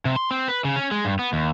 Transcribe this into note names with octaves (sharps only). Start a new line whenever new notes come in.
C3
C6
C4
B4
C#3
C#4
G#3
G2
B3
D#2